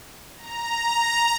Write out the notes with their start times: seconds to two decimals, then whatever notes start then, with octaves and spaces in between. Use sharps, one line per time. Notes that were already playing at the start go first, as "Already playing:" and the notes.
0.37 A#5